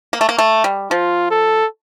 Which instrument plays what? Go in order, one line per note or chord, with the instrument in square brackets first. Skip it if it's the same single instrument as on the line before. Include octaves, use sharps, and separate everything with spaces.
[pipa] A#3
A3
A#3
A3
G3
[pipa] F3 [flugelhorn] F4
[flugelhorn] A4